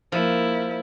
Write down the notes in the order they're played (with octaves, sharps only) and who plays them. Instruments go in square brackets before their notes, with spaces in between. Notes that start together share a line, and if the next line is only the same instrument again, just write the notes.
[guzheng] F3 [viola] A#3 E4